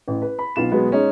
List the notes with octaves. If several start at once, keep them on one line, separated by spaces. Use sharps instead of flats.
A1
B4
B5
B1 B3 F4 E7
B2 F#3 G#3 B3
G#3 C#4 D#4 G#4